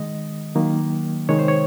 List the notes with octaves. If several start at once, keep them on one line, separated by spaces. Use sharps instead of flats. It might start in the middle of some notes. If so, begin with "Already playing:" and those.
Already playing: D#3 G#3 D#5
D#3 F#3 A#3
C3 D#3 G#3 C#5
C5
C#5